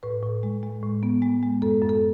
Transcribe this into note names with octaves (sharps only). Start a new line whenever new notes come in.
A2 B4
A2
G#3
G#3
A2
B3
G#3
G#3
F#2 A4
F#2
A4